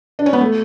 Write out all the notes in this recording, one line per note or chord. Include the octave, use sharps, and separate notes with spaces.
D4
C#4
B3
A3